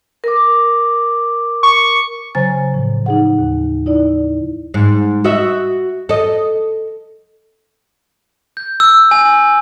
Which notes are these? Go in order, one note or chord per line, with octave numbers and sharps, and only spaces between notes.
A#4 D6
C#6
C#3 F#3 C5 G#5 A#5 A6
A2 F3
D#4 G#4 F#5
D#2
D#4 E4 D5
G#2
F#4 D#5 E5
A4 D#5
G6
E6
G#5